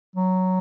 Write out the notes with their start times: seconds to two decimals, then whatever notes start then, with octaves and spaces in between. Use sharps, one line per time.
0.16 F#3